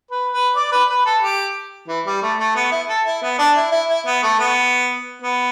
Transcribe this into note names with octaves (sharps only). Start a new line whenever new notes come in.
B4
B4
D5
B4
B4
A4
G4
E3
G3
A3
A3
B3
E4
A4
E4
B3
D4
E4
E4
E4
B3
A3
B3
B3